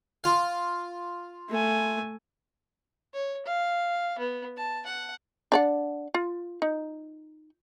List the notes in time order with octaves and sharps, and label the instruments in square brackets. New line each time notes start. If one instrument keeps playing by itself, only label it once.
[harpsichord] F4 F5
[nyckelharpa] A3 G#5
[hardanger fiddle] C#5
F5
B3
A5
F#5
[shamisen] D4 D5 F#5
F4
D#4